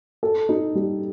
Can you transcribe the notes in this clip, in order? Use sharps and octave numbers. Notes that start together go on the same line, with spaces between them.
A4
D#4
G3